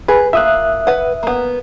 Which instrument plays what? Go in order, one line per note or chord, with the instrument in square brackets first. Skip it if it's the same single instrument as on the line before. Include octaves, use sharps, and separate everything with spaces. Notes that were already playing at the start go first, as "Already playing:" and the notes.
[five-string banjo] G#4 [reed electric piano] B4
[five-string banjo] A#3 F4 [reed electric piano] E5 D#6 F#6
[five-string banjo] B4 F#5
A#3 B3